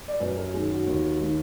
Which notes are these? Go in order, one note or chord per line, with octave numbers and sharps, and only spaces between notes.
D5
F#2 B4
A#4
D#3 G#4
F#4
D#2
D#3